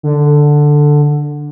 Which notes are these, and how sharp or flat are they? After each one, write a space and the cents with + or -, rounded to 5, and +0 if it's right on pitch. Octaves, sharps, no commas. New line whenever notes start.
D3 +5